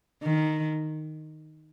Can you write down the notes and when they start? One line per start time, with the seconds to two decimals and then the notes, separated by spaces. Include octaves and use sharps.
0.23 D#3